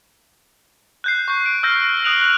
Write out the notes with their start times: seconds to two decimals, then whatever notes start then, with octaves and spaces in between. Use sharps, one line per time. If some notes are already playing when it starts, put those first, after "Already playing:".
1.04 F#6 G6 C7
1.28 C#6 G6
1.46 D7
1.63 E6 F6 G6 A#6
2.04 D#6 F#6 D7 F7 F#7
2.21 F#6 D7